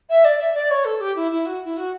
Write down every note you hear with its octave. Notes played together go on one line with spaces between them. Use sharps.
E5
D5
E5
D5
C#5
A4
G4
E4
E4
F#4
E4
F#4